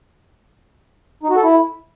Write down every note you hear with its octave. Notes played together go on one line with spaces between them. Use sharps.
D#4
F#4
A4
E4